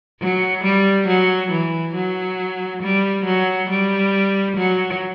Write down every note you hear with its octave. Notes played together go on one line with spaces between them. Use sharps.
F#3
G3
F#3
E3
F#3
G3
F#3
G3
F#3